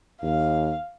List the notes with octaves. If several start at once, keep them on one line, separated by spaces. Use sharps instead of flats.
D#2 F5